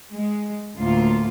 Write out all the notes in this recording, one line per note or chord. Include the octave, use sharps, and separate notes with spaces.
G#3
D2 A2 A#3 F4